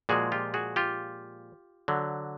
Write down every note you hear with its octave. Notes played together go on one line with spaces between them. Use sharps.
A#2 F3 G#3 F#4 G#4
F4 G4
F#4 G#4
F4 G4
D3 F#3